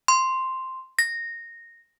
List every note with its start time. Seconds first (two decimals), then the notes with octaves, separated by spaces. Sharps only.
0.08 C6
0.99 A#6